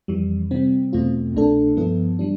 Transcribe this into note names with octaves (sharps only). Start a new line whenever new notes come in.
F2 E3 G3
C3 G3 C4
E2 B2 A3 C4 F4
C2 B2 A3 D4 A4
G2 F3 B3 E4 A4
E3 G3 D4